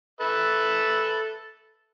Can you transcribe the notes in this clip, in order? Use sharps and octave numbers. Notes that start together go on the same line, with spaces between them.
A4 B4 E5